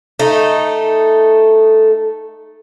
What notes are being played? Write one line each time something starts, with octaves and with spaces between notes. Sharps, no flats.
A3 D#4